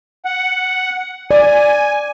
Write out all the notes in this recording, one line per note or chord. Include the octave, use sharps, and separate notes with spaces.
F#5
D5 G#5